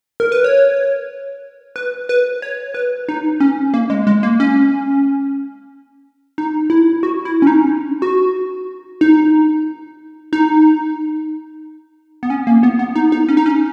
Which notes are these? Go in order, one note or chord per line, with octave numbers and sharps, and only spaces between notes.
A#4
B4
C#5
B4
B4
C#5
B4
D#4
C#4
A#3
G#3
G#3
A#3
C#4
D#4
E4
F#4
E4
C#4
D#4
F#4
D#4
D#4
B3
C#4
A#3
B3
B3
D#4
D#4
C#4
D#4
C#4